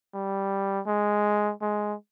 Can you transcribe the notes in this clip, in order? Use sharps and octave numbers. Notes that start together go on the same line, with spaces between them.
G3
G#3
G#3